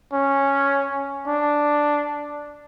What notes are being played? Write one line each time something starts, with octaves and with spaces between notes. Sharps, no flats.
C#4
D4